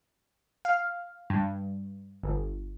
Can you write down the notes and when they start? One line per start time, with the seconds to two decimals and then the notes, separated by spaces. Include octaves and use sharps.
0.65 F5
1.30 G2
2.23 G1